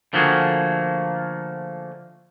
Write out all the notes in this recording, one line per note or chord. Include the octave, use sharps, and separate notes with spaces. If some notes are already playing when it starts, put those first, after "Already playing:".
D3 F3 A3 A#3 F#4 G#4